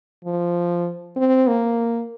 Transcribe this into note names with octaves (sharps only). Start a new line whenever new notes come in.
F3
C4
A#3